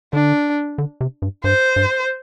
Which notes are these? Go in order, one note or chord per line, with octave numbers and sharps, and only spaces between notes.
D3 D4
D3
C3
G2
G2 C5
G2